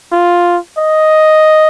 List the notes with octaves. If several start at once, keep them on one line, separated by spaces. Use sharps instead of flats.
F4
D#5